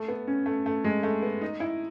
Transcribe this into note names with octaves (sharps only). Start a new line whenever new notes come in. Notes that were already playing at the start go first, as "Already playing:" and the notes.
Already playing: A3
B3
C#4
A3
A3
G#3
A3
B3
D#4
E4